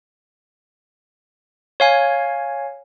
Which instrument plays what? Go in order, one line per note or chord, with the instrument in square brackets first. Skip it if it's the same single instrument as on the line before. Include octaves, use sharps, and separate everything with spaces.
[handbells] C#5 F5 G#5